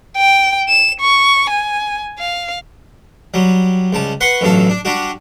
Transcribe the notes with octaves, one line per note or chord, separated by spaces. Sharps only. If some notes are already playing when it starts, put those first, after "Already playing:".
G5
E7
C#6
G#5
F5
F#3 G3
C#2 G3 A5
B4 F#5 C6 C#6
A1 G2 F#3 A4 F5
D4
G3 D4 F#4 G4